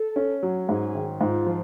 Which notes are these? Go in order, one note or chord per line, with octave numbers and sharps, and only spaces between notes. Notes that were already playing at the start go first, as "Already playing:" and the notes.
Already playing: A4
C#4
F#3
G#2 G#4
D#3
G#2 F4
F3